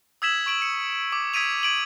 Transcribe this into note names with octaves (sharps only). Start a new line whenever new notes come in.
D#6 E6 G#6 B6 E7 F#7
C#6 D7 F#7
C#7
D6
D#6 G#6 B6 D7 D#7 F7
G#6 D7 F#7